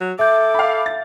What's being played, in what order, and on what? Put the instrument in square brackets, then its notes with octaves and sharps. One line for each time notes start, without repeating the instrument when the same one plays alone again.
[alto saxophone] F#3
[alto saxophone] A4 [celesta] E5 G6 [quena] D6
[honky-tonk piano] F5 B5
A6